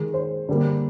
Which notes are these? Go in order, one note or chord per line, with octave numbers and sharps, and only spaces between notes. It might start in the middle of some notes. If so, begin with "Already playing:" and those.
Already playing: D#3 G#3
C5
D3 G3 A#3